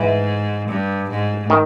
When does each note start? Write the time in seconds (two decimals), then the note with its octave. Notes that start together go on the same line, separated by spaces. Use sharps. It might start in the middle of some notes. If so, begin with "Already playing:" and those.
Already playing: G#2 E3
0.69 G2
1.10 G#2
1.50 D#3